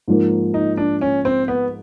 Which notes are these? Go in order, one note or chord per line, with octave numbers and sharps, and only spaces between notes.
G#2 F3 A#3
D#4
D4
C#4
C4
B3